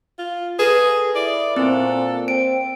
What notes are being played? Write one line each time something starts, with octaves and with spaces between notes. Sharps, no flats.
F4
G#4 A4 B4
E4 D5
A#2 C4 A4 C5
C4 D7